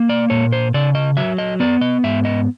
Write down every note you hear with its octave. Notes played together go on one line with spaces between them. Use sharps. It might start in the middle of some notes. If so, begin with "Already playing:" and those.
Already playing: A#3
D5
A#2 C#5
C5
C#3 D5
D#5
F#3 E5
D#5
B3 D5
D#5
G#2 E5
D#5